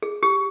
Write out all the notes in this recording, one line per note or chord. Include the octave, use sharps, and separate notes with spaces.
G#4
G4